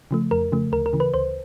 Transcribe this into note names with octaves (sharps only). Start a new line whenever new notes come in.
C#3 F3 A3
F2 A#4
C#3 F3 A3
D2 A#4
A#4
C#3 E3
B4
D2 C5